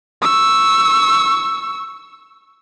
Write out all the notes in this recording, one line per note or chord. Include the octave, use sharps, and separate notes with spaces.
C#6 E6